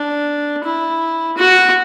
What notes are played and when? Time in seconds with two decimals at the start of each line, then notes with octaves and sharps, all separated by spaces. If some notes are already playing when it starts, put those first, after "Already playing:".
Already playing: D4
0.64 E4
1.37 F#4